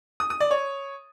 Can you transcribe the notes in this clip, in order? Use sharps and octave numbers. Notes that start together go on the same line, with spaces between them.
D#6
D#6
D5
C#5